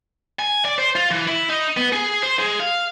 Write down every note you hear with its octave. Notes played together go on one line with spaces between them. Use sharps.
G#5
D5
C5
F4
E3
E4
D#4
B3
G#4
C5
G#3
F5